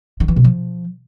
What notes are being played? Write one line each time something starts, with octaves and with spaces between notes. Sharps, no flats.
D#3
E3
B2
F3